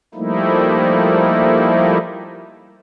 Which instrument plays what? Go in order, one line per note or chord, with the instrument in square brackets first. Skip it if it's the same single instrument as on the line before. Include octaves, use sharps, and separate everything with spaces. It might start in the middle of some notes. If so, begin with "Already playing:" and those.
[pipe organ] F3 G3 A3 A#3 D#4 E4